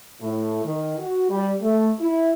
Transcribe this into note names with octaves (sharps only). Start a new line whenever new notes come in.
A2
D#3
F#4
G3
A3
E4